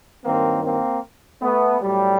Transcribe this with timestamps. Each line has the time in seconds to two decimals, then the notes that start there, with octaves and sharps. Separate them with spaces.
0.24 G2 D#3 F#3 A#3 C4
0.64 A#3 C4
1.42 A3 B3
1.81 A2 F#3 G3